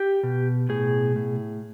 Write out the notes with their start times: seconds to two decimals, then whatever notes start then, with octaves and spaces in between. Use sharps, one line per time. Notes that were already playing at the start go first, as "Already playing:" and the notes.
Already playing: G4
0.23 B2
0.69 A2 G#4
1.16 A2